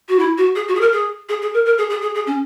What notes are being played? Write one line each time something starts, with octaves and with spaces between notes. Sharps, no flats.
F#4
E4
F#4
G#4
F#4
G#4
A#4
G#4
G#4
G#4
A#4
A#4
G#4
G#4
G#4
G#4
C#4